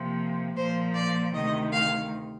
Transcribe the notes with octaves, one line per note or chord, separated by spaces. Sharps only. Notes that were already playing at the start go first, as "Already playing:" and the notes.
Already playing: C3 F3 A#3
A#2 F3 A#3 C5
D5
D2 C3 D#3 D#5
F5